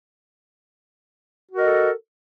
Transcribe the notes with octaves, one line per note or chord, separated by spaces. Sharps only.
F#4 A4 A#4 D#5